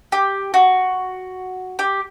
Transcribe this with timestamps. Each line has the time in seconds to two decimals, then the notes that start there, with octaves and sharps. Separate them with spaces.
0.12 G4
0.54 F#4
1.79 G4